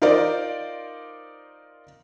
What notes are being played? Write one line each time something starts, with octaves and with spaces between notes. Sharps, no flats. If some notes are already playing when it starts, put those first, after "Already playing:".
D#4 F4 A#4 C5 D5